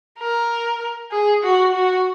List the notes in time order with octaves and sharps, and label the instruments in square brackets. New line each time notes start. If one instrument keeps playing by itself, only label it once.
[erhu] A#4
G#4
F#4
F#4